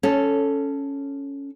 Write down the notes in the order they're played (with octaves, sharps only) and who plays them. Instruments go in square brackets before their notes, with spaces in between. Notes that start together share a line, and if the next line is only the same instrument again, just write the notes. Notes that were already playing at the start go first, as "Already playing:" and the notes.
[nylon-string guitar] C#4 A4